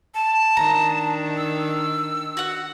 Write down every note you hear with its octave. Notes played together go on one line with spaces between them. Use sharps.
A5
D#3 D4 A#5
E6
F#4 F#5